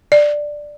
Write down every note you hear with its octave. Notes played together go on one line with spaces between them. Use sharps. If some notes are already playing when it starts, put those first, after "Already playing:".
D5